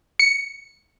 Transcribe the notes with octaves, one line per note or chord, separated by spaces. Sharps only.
C#7